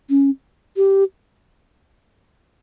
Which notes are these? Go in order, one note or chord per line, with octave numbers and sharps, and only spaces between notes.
C#4
G4